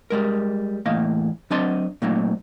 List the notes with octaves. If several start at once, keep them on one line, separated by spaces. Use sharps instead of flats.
G3 G#3 A#4
E2 A2 A#3 D#5 F5
F#3 C4 D4 D#5 A5 C6
A#2 F#3 A3 A#3 C4 D#4